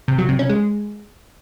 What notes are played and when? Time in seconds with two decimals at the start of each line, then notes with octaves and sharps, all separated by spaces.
0.08 C3
0.18 F#3
0.29 C3
0.39 C#4
0.49 G#3